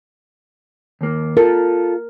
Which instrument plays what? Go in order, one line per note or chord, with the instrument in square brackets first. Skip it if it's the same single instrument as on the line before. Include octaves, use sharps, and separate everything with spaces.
[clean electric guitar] D#2 A#3
[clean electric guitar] F4 A4 [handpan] A#4